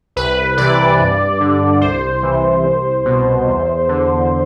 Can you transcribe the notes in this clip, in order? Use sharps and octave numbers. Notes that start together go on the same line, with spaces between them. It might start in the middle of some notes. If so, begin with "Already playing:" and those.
C2 B4
C3 E3 D5
G2
D3
C2 C5
C3 E3
C2
B2
E2
D3